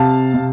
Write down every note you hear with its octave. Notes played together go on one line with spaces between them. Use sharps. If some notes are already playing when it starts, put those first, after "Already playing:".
Already playing: C3 F5 A5
C3